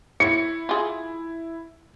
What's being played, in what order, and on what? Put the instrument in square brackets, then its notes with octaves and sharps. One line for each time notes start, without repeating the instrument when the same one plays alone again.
[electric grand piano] E4 [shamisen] C#5 [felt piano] C#7
[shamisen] F4 G#4